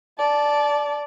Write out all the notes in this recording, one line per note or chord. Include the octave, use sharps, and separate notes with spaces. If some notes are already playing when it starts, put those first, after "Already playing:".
D5 A5